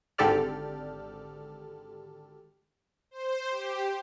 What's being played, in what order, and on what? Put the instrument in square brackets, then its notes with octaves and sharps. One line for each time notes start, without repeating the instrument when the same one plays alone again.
[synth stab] G#1 D3 G4 A4 D5 F6
[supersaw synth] C5
G4